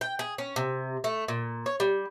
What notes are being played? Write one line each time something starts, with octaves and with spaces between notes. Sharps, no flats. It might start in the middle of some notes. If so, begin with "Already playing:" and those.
G5
G#4
C#4
C3
A3
A#2
C#5
G3